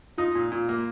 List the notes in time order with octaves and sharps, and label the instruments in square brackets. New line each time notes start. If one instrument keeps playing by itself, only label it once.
[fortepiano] D#4 [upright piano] F4
[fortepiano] A#2
A#2
A#3